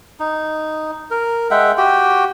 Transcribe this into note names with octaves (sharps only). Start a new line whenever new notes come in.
D#4
A#4
G#3 E5 F#5 G5
F#4 G4 G5